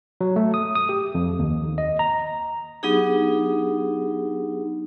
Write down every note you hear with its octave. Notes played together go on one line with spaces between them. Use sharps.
F#3
A3
D#6
D#6
G4
F2
D#2
D#5
A#5
F#3 B3 D4 D#4 G4 G#4